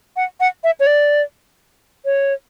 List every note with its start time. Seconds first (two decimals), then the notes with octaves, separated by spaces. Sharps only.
0.16 F#5
0.40 F#5
0.64 E5
0.80 C#5
0.87 D5
2.05 C#5